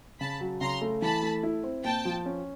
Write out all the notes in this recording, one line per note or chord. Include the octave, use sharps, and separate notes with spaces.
C#3 A5 B5
F#3
C#3 A#5 C6
A3
E3 A5 B5
A3
E4
C4
A#2 G5 A5
F3
C#4